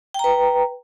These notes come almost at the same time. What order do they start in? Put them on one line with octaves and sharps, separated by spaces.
G5 A#5 B4